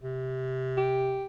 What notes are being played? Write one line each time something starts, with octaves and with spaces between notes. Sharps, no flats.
C3
G4